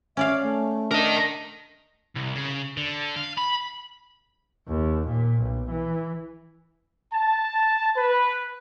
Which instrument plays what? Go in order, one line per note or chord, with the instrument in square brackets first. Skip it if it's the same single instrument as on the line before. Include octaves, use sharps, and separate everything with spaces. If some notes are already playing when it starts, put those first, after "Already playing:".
[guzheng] C#4 D5 F5 [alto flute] E5
[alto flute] A3
[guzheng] D4 [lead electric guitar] A#4 D#5
[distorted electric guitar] C2
C#3
D3
F5
B5
[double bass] D#2
A#2
B1
E3
[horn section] A5
B4